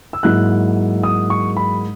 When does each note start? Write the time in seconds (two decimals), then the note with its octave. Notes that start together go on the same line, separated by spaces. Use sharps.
0.13 E6
0.23 G#2 F#3 A#3 E4 F#6
1.03 D#6
1.30 C#6
1.57 B5